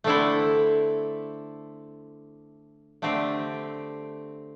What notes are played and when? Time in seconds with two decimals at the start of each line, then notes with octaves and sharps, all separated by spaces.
0.04 D3 A3 C4 E4 A4
3.02 D3 A3 C4 G4